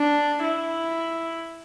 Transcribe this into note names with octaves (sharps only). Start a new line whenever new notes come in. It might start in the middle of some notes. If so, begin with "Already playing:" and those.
Already playing: D4
E4